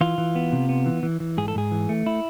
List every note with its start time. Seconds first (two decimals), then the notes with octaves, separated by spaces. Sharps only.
0.01 E3 F4
0.18 E3
0.35 B3
0.52 C3
0.69 B3
0.86 E3
1.03 E3
1.20 E3
1.38 G#2 G#4
1.48 A4
1.55 G#2 G#4
1.72 E3
1.89 A3
2.06 E4